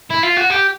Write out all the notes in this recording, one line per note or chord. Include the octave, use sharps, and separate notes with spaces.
E4
F4
F#4
G4